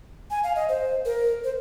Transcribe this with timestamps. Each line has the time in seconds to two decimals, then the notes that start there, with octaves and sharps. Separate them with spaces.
0.31 G#5
0.44 F5
0.56 D#5
0.69 C5
1.05 A#4
1.44 C5